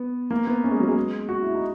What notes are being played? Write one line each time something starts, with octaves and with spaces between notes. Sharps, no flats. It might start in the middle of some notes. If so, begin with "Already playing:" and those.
Already playing: B3
A#3
B3
C#4
G#3
F#3
G#3
F#4
E4
D#4